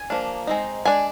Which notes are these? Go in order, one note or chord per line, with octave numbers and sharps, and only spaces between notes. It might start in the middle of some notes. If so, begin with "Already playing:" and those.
Already playing: G#5
F3 A#3 D4
G#3 C4 D#4
G#3 D4 G#5